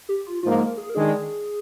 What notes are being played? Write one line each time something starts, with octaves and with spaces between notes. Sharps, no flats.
G4
F4
G#2 F3 A#3 F4
A#4
G#4
A#4
D#3 G#3 D4 G#4